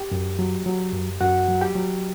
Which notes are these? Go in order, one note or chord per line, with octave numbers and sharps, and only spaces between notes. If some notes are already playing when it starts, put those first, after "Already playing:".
Already playing: G4 G5
F#2
F#3
F#3
F#2
F#2 F#4 F#5
F#3
G4 G5
F#3